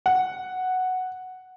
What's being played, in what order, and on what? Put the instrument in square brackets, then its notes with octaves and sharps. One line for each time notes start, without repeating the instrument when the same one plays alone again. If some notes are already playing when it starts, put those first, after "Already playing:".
[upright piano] F#5